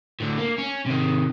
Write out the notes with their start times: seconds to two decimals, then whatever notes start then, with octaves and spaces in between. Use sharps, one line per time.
0.20 A2 D3
0.38 A#3
0.58 C#4
0.86 C3 D#3